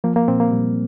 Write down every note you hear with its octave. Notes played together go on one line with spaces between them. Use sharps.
F3 A#3
A#3
A#2 C4
A#3
A#2 G3